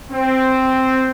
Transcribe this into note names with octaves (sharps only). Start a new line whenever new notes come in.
C4